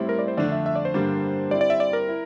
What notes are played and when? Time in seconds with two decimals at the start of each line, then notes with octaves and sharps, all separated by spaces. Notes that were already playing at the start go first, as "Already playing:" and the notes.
Already playing: A2 G3 C4 E4
0.09 A#4
0.19 D5
0.28 C5
0.37 F2 D3 A3 D4 D5
0.52 E5
0.66 E5
0.76 D5
0.85 C5
0.94 G2 D3 G3 A#3 D4
1.51 G3 C4 E4 D5
1.61 D5
1.70 E5
1.80 D5
1.93 A#4
2.08 E4